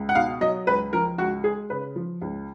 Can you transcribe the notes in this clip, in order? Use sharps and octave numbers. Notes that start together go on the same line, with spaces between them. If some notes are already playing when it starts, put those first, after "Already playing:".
Already playing: C#2
F#5
B2 F5
F#3 D#5
C#2 B4
F3 A#4
C#2 F#4
G#3 G#4
C#3 B4
F3
C#2